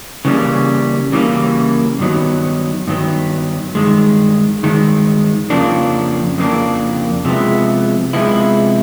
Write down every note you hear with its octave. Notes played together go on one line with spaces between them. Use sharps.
C#3 E3 G3 A#3
C#3 E3 G3 A#3
G2 D#3 F#3 B3
G2 D#3 F#3 B3
G2 D#3 G#3
G2 D#3 G#3
F2 C#3 F3 A#3 D4
F2 C#3 F3 A#3 D4
C3 F3 G#3 B3 E4
C3 F3 G#3 B3 E4